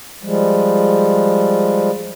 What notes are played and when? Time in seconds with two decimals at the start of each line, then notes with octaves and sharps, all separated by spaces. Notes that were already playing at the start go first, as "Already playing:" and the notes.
0.23 F3 G3 G#3